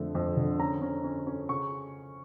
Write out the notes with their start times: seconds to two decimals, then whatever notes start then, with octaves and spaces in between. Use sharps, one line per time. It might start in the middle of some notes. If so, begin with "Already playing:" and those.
Already playing: F2 D3 A3
0.15 F2
0.37 D3
0.59 C#4 A#5
0.82 C#4
1.04 C#4
1.27 C#4
1.49 C#3 C#6